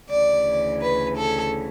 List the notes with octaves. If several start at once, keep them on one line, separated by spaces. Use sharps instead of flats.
D2 C#3 E3 D5
B4
A4